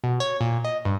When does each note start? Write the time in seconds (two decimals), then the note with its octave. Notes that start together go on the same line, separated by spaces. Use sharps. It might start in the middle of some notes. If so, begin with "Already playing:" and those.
0.04 B2
0.20 C#5
0.41 A#2
0.65 D#5
0.85 G2